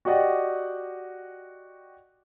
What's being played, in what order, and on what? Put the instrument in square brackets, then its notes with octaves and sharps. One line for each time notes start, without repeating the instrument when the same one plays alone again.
[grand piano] F#4 G4 D5 D#5 F#5 G5